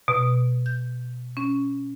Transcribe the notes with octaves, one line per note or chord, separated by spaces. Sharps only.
B2
G6
C#4